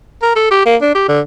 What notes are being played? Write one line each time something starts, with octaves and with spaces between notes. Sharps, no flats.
A#4
A4
G4
A#3
D4
G4
D3